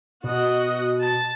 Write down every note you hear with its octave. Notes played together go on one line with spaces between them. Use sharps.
B2 F#4 D#5
A5